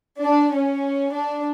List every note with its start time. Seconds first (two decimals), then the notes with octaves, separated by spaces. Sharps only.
0.23 D4
0.53 C#4
1.13 D4